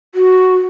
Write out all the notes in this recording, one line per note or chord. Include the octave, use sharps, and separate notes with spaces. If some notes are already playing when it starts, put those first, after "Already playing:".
F#4